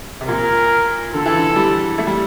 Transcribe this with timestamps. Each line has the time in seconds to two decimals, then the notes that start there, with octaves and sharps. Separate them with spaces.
0.21 C3
0.28 A#2 A#4
1.13 D3 A4
1.26 E3
1.37 D3
1.56 G3
1.98 A3
2.07 G3